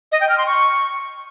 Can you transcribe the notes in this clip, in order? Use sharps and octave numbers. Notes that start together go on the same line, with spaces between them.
D#5
G5
F6
C6
C#6